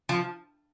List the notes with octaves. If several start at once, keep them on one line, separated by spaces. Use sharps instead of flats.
F3